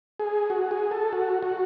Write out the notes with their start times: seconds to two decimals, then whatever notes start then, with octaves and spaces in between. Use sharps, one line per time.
0.20 G#4
0.50 F#4
0.71 G#4
0.91 A4
1.13 F#4
1.42 F#4